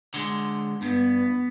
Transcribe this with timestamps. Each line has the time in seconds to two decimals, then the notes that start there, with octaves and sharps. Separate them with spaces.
0.14 D3 G#3
0.82 G2 B3